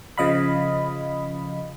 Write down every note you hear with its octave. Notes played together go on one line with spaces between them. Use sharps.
C#3 F3 D#5 F5 B5